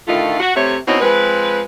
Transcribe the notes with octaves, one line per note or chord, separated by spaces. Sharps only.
A2 D3 D#3 A3 F4
F#4
C3 A3 C#5
B2 C4 C#4 D#4 E4 D#5
F3 G#3 C4 B4